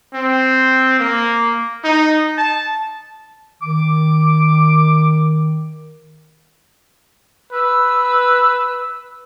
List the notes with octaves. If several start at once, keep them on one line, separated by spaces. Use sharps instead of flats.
C4
A#3
D#4
A5
D#3 D6
B4 E6